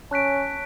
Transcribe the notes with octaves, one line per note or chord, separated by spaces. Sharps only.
C#4 A5 C#6 F#6 B6 D7